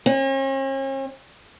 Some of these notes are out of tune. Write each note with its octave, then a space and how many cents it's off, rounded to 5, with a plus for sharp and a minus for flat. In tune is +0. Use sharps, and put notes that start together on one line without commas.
C#4 -45